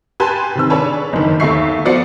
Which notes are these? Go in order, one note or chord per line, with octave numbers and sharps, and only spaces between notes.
G4 B4 G#5 A5 C6 F#6
C3 D#3 E6
D4 G#4 B4 C#5 A5
F#1 D#3
D#2 A3 E5 C#6 C7
F3 B3 F#4 D5 C7 C#7